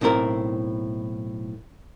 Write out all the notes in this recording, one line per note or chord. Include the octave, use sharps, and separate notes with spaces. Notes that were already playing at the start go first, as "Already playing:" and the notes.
B1 A2 C4 E4 A#4